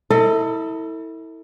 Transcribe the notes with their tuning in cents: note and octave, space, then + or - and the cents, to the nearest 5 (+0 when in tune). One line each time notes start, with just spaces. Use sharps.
E4 -25 A4 +35 D#5 +0